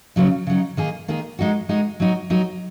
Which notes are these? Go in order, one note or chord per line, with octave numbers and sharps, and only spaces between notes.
C#3 F#3 D#4
C#3 F#3 D#4
D#3 A#3 D#4 G#4
D#3 A#3 D#4 G#4
G#3 D#4 F#4
G#3 D#4 F#4
F#3 D#4 F#4
F#3 D#4 F#4